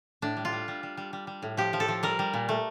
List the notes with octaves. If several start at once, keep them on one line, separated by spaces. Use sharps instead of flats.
A2 D4
G3
F4
G3
G3
G3
G3
G3
G3
A2
F3 G4
F3
A4
F3
G3 A#4
G3
A#2
A3